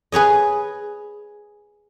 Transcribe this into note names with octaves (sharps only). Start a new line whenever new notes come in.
G#4 B4 C#5 D#5